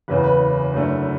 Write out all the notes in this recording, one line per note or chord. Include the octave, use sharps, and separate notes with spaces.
F#1 E2 C#3 B4
B4
F#1 F#2 D3 A3